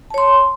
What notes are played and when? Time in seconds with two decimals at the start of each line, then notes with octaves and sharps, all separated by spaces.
0.10 A5
0.14 C#5
0.18 C6